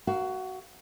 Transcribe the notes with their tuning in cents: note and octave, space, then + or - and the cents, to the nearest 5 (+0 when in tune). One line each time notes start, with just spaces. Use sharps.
F#4 +15 A#4 +10 F5 -15